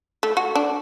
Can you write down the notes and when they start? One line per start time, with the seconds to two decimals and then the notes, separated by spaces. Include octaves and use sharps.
0.23 A3
0.37 F#4
0.55 D4